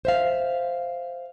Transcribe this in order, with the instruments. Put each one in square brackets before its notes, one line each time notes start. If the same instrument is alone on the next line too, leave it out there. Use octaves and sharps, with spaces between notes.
[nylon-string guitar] C5 E5 F5